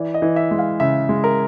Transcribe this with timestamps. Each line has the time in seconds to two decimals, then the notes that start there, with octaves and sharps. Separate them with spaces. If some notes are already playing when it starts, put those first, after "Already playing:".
Already playing: E3 D5
0.14 D#5
0.22 E3
0.36 E5
0.51 G#3
0.59 F5
0.80 C#3 E5
1.09 G#3
1.24 A#4